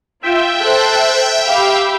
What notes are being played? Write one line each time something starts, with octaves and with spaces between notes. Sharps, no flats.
F4 E5 G5
A4 C5 F#6
G4 F5 B5